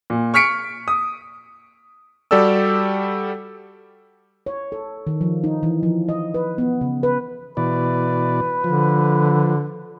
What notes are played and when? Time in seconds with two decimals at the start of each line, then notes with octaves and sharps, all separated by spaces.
0.10 A#2
0.34 C#6 F6 B6 C#7 D7
0.88 D#6
2.31 G3 F#4 G4 A4 D5 E6
4.46 C#5
4.72 A4
5.07 D#3
5.21 F3
5.44 D#4
5.63 E3
5.83 F3
6.09 D#5
6.34 B4
6.58 B3
6.81 C#3
7.03 B4
7.57 B2 E3 B4 D5
8.64 D3 F3